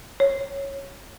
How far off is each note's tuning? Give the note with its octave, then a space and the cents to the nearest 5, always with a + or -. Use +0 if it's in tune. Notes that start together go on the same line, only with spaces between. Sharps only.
C#5 -10